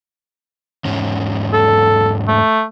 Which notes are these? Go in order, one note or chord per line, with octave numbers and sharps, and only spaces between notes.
E2 G#2 C#4
A4
A3